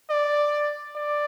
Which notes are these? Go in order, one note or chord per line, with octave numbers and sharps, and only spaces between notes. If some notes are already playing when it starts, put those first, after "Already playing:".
D5
D5